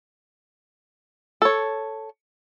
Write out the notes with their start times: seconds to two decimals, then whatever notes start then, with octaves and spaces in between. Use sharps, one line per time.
1.42 A4 C#5